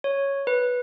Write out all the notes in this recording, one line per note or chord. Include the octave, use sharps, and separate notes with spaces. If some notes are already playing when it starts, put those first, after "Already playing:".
C#5
B4